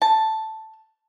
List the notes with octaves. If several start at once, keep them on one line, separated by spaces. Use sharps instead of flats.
A5